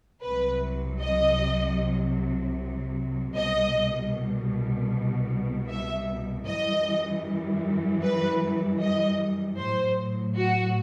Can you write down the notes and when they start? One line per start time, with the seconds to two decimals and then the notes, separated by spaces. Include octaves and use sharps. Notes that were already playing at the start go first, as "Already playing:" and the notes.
0.22 C2 C3 F#3 B4
1.01 D#5
3.35 C2 B2 G3 D#5
5.69 E5
6.47 F#2 E3 G3 D#5
8.04 B4
8.81 D#5
9.59 A2 F#3 C5
10.37 F#4